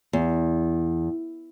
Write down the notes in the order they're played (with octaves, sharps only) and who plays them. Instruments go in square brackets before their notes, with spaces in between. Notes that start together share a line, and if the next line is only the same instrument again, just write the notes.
[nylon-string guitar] E2